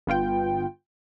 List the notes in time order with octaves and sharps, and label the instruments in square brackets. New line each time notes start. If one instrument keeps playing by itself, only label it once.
[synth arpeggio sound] G1 B3 F4 G5